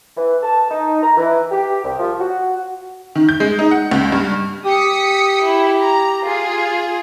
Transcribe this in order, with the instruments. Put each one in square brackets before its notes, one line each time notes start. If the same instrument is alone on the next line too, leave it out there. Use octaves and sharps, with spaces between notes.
[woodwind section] E3
A5
D#4
A#5
E3
G4
C2
F3
F#4
[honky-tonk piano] D#3
G6
G#3
D#4
F#5
C#2
G2
[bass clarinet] G4 [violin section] D#6 B6 C#7
[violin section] E4
A#5
F4 G#4